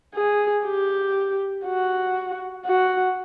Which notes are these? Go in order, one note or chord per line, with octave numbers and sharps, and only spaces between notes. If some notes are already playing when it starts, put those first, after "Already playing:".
G#4
G4
F#4
F#4